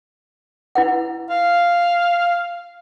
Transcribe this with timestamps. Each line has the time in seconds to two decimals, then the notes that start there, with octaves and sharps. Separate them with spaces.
0.75 E4 B4 F#5
1.30 F5